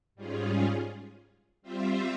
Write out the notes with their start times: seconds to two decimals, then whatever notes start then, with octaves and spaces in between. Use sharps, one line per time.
0.15 G#2 G3 C#4 F4 G#4
1.62 G3 C4 F4 C5 E5